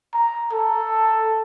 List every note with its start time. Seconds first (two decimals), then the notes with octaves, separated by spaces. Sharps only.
0.13 A#5
0.53 A4